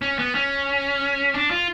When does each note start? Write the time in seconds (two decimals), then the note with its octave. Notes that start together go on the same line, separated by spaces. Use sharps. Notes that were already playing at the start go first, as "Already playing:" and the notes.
0.02 C#4
0.19 B3
0.35 C#4
1.34 D4
1.51 F4